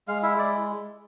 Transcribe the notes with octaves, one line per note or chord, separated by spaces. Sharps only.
G#3 F5
E4 E5
G#3 D5